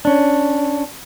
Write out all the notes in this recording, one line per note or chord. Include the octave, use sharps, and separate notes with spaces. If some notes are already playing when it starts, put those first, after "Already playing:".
C#4 D4